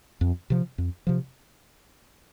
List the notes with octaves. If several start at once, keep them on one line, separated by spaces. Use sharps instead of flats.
F2
C3 F3
F2
C3 F3